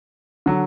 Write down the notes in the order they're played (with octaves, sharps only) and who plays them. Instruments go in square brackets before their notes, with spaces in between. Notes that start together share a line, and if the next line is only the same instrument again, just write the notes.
[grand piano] D3 F#3